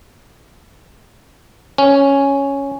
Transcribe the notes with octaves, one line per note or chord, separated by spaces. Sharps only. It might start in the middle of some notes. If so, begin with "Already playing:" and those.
C#4